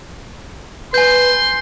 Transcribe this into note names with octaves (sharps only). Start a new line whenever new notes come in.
B4 G#5 C6 G6